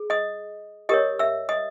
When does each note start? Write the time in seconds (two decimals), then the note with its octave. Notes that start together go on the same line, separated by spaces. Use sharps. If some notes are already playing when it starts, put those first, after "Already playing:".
Already playing: G#4
0.10 D#5 D#6
0.89 G4 A#4 C#5 D#5 D#6
1.19 E5 E6
1.49 D#5 D#6